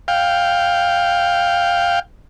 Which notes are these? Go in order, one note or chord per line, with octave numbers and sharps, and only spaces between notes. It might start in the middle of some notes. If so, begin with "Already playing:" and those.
F5 G5